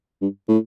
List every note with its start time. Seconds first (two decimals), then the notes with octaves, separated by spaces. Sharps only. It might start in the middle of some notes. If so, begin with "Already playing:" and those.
0.22 G2
0.48 A2